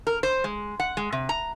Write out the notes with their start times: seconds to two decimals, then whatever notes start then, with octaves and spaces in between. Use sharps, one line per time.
0.07 A#4
0.23 C5
0.44 G#3
0.80 F#5
0.97 G#3
1.12 C3
1.29 A#5